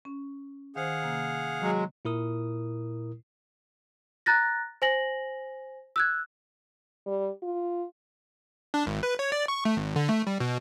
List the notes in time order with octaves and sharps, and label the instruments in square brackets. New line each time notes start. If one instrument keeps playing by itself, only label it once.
[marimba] C#4
[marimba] D#3 C5 [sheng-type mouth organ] G#4 F5 F#5
[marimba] C3 A#3
[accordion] F#3 G#3
[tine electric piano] A#2 E4 A#4 D#6
[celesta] A#5 F#6 A6 A#6
C5 G#5 A#6 F#7
E6 F#6 G#6
[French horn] G3
F4
[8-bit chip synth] D4
G#1
B4
C#5
D5
C#6
A3
G#1
D3
A3
G3
B2